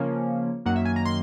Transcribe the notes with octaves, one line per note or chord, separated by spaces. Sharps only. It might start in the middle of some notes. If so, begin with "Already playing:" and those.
Already playing: C#3 F3 A#3 C#4
F#2 D#3 F#3 A#3 F#5
E5
G#5
A#5
C6